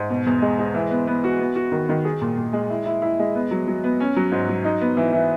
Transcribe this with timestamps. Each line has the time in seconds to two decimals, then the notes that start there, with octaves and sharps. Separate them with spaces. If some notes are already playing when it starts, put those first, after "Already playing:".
Already playing: G#2
0.10 B2
0.26 E2
0.42 G#3
0.59 G#3
0.74 E3
0.91 B3
1.07 B3
1.24 F#4
1.39 B3
1.56 F#4
1.72 D#3
1.89 D#3
2.05 G#4
2.21 A#2
2.38 A#2
2.53 G#3
2.70 E4
2.85 E4
3.02 E4
3.19 G#3
3.35 B3
3.51 F#3
3.67 F#3
3.84 B3
4.00 C#4
4.16 F#3
4.32 G#2
4.48 F#3
4.64 D#4
4.81 B3
4.97 E3
5.13 E3